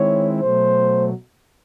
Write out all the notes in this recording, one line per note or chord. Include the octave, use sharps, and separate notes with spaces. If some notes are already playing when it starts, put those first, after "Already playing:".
Already playing: D#3 G#3 C4 E4 C#5
B2 F#3 A3 C5